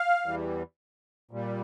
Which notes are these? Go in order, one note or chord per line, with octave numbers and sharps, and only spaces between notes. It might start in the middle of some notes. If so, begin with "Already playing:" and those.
Already playing: F5
E2 E3 G3
A#2 G3